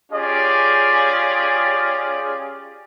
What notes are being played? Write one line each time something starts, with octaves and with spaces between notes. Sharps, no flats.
C#4 F4 G4 G#4 D5